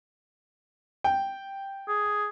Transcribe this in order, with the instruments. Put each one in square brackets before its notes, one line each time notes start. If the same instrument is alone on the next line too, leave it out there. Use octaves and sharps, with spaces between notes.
[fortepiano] G5
[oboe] G#4